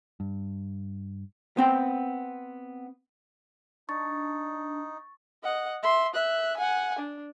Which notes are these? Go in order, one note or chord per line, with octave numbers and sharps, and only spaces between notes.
G2
B3 C4 G5
D4 D#4 C#6 A6
D#5 F#5
E5 C6
E5 F#6
F#5 G#5
D4